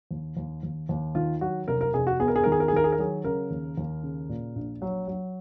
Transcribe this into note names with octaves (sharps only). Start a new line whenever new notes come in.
D#2
D#2
D#2
D#2
D#3 F4
F#3 F#4
F1 A#4
A#4
F1 G#4
F#4
B3 G#4
A#4
G#4
D#3 A#4
G#4
A#4
G#4
D#3 A#4
G#4
A#4
F#3 G#4
C#3 A#4
D#2
D#2
C#3
A#2
A#1
F#3
F#3